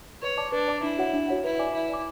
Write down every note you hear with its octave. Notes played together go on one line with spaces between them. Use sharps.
B4 C#5
D5 A5 D6
D4 B4
D5 A5 D6
D4 E4
F#4 C#5 F#5
D4
F#4 C#5 F#5
E4 B4
D5 G#5 D6
E4 B4
D5 G#5 D6